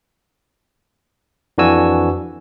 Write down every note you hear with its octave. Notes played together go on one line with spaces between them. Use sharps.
F2 E3 D4 F#4 G#5 E6